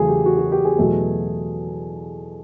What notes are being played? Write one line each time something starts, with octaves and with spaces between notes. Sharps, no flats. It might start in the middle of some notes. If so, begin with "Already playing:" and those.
Already playing: E2 C#3 F#3 A3 G#4
G4
F#4
F#4
G4
G#4
E2 B2 F#3 A3